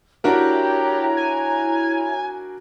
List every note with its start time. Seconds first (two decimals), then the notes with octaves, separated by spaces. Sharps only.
0.24 D4 E4 F#4 G4 A#4 C#5 A#5
1.17 G#5